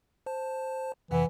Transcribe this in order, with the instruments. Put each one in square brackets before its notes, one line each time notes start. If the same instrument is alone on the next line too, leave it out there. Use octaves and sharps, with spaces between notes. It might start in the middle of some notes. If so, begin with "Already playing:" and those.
[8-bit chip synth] C5 A5
[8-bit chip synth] F2 C3 F#5 [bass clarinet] E3